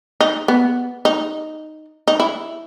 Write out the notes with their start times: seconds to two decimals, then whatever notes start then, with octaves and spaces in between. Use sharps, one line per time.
0.21 D#4
0.48 B3
1.05 D#4
2.08 D#4
2.20 E4